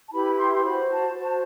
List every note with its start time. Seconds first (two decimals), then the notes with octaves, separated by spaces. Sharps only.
0.09 A5
0.12 E4 G4 B4 B5
0.38 C6
0.53 C6
0.65 F#4 C5 B5
0.90 A5
1.17 F#4 C5